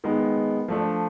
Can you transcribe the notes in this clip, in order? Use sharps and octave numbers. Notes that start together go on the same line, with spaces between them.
D#3 G#3 B3
F3 A3 D4